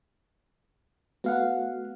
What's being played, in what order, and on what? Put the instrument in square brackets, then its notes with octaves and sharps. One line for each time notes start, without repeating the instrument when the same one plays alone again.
[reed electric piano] A3 F#4 [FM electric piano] B3 F5 F#5